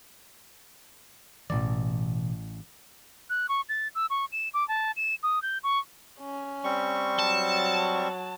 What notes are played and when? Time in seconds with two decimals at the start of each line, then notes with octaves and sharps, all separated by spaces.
1.50 A1 B2 E3 D5
3.30 F#6
3.49 C#6
3.69 A6
3.95 E6
4.10 C#6
4.32 E7
4.54 D6
4.68 A5
4.96 E7
5.23 D#6
5.42 G6
5.64 C#6
6.21 C#4
6.64 G3 C4 C#6
7.19 F#3 A5